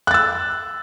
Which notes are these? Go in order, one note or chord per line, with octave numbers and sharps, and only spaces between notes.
E6 F#6 A6